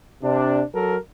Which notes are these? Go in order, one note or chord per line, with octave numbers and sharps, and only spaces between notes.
C3 D4
F#3 A4 A#4